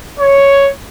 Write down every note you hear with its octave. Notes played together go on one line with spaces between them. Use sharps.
C#5